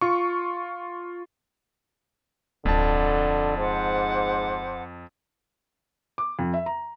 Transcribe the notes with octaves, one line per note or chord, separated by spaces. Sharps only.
F4 C#6
D1 F2 D3 A5
G#2 C5 F#5 D6
D6
F2
E5
A#5